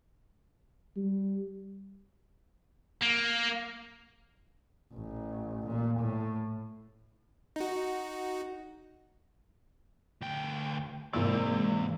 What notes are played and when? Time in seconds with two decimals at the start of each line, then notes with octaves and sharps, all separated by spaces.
0.96 G3
3.02 A#3
4.93 A1
5.67 A#2
6.00 A2
7.56 D#4 F#4
10.21 D2 G5
11.13 G#1 C3 E3 G#3 A#3 D5 E6